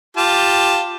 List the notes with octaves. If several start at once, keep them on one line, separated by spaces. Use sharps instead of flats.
F4 G4 A5